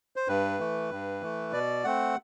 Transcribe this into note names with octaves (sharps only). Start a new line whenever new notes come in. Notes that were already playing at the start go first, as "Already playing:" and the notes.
C5
G2 B4
E3 A3
G2
E3 A3
B2 D5
A3 C4 F#5